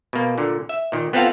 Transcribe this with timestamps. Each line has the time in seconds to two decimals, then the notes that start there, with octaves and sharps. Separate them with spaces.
0.13 B2 A#3
0.38 A#2 D3
0.69 E5
0.92 A#2 D#3
1.13 B3 C4 F4 A4 F5 F#5